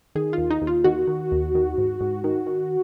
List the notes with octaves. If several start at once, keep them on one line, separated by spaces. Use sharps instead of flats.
D#3 G#4
F4
D#2
D#4
D#2
F4
D#3 F#4
D#3
D#2
D#3
G#2
G#2
D#3
D#3